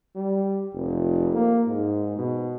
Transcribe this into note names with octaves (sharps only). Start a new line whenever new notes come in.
G3
F1
A#3
G#2
B2